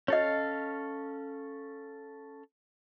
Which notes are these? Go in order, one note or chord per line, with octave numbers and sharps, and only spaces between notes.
C#4 A4 C#5 D#5 F5